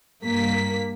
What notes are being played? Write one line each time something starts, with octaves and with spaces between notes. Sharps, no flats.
G2 A#3 B6